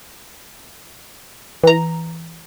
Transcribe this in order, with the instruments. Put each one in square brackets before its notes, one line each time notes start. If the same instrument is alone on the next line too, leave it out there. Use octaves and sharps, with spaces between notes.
[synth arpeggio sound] E3 A#5